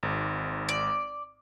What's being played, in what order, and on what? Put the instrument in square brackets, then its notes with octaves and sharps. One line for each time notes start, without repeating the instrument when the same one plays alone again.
[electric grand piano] G#1 G#2
[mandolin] D5